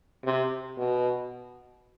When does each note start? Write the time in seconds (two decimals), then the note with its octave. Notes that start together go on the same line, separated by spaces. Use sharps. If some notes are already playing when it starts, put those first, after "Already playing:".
0.25 C3
0.77 B2